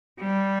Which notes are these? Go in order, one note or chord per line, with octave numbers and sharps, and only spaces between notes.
G3